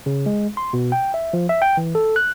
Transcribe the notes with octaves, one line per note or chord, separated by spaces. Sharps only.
C#3
G#3
C6
B2
G5
E5
F3
E5
G5
E3
A4
F#6